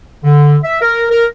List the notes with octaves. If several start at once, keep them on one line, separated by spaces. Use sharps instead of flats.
D3
E5
A#4
A#4